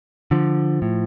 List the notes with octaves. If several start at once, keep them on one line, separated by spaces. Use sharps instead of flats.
D3 F3
A2